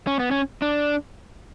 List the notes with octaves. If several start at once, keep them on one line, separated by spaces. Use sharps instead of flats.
C#4
B3
C#4
D4